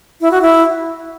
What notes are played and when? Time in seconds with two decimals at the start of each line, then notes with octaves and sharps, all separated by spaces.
0.21 E4
0.31 F#4
0.42 E4